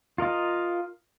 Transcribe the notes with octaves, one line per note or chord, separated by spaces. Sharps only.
F4 A#4 D#5 F5